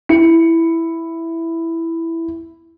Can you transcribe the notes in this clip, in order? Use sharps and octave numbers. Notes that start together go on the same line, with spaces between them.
E4 C#7